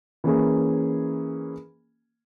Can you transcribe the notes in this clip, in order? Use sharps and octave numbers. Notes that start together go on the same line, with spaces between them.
E3 A#3 C#4 G#4